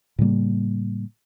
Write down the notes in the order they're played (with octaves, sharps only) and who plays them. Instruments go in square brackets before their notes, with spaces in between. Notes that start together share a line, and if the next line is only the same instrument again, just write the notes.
[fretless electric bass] A2 C#3 G3 A#3